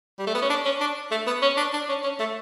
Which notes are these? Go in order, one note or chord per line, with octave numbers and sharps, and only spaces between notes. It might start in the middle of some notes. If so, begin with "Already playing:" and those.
G3
A3
B3
C#4
D4
C#4
D4
A3
B3
C#4
D4
D4
C#4
C#4
A3